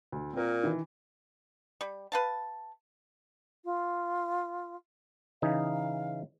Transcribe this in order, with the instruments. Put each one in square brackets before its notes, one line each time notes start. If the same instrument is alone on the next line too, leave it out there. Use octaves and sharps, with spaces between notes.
[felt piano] D2
[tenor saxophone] A#2 [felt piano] C4 A#4
[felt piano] D#3 E3
[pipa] G3
B4 F5 A5
[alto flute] F4
[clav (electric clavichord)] C#3 E3 D#4 [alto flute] F5